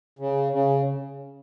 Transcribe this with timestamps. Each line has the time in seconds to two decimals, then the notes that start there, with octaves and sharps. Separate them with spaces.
0.19 C#3
0.52 C#3